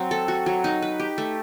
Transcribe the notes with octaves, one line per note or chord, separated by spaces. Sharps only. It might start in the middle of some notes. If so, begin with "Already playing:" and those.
Already playing: F#3 C4
A4
F#4
F#3
D#4
B4
G4
A3